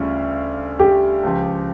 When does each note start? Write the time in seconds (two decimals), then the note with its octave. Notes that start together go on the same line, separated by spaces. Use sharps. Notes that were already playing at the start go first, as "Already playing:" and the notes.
Already playing: D2 C#3 G3 C#4 F4
0.79 G4
1.23 C#2 C#3 F3